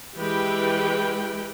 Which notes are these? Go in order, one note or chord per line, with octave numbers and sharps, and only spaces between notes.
E3 G#3 G4 B4 G5